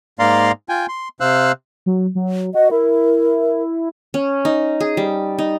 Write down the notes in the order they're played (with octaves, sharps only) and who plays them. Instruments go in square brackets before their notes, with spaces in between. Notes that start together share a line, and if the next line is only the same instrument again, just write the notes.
[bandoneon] G#2 A#3 D5 F5 A#5 C6
F4 G5 G#5
C6
C3 C5 F5 E6 F#6
[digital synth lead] F#3
F#3
[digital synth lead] F#4 [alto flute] D#5
[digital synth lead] E4 [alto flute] A#4
[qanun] C#4
D#4
G#4
G3
D#4